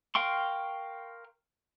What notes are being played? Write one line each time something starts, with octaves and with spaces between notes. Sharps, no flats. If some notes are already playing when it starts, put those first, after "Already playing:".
A#4 F5 G5 C6 C#6